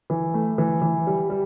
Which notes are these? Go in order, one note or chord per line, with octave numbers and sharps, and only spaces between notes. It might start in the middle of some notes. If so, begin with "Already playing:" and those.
E3
A3
E3
E3
G3
G3